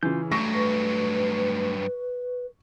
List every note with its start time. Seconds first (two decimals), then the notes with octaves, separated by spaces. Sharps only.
0.03 C#3 E3 F4 G6
0.32 G2 F#3 A3 C#6 A#6
0.54 B4